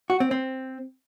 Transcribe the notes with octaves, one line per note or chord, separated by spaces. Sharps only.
F#4
C4
C4